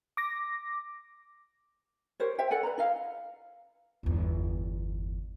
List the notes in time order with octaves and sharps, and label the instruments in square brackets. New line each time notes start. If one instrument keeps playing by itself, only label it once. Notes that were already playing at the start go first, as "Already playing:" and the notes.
[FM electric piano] D6 A#6
[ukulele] G4 A#4 C5 C#5
C5 E5 G5
A4 D5 F#5 G#5
B4 D5 A#5
E4 D#5 F5
[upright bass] G1 E2